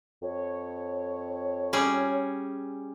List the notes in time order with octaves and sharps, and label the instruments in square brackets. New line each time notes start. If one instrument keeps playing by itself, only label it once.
[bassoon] F2 [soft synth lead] C#5
[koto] G3 C#4 G#4